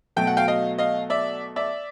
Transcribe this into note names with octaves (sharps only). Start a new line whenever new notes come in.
B2 F#3 A3 G5
F#5
F5 G5
D#5 F5
D#5 F5
D5 E5
D5 E5